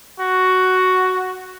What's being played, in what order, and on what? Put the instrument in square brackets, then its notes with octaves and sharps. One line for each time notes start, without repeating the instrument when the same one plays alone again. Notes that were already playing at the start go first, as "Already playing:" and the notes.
[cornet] F#4